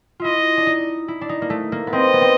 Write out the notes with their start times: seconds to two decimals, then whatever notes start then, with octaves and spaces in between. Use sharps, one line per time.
0.20 E4 F4 D#5
0.57 D4
0.67 D#4
1.08 E4
1.21 D4
1.29 D#4
1.42 A#3
1.50 A3
1.72 A#3
1.87 B3
1.93 C4 D#5
2.13 B3
2.21 C4